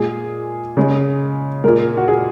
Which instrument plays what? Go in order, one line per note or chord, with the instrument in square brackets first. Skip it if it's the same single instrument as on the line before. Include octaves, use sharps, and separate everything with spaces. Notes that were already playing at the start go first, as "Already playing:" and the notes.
Already playing: [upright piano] A#2 G#3 G#4
C#3 G#3
A#2 G#3 A#4
F#4
G#4